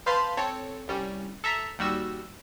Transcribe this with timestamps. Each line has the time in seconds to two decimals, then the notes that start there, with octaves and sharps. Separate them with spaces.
0.06 B4 C5 F5 A5 B5 C6
0.37 C4 A4 C#5
0.88 C2 G3 C#4
1.44 A4 E5 A#5
1.79 D#2 G3 F#4 E6